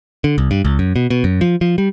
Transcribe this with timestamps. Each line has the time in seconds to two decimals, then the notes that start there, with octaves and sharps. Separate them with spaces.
0.24 D3
0.38 C2
0.51 G2
0.65 C#2
0.79 F#2
0.96 B2
1.10 B2
1.24 F#2
1.41 F3
1.61 F3
1.78 G3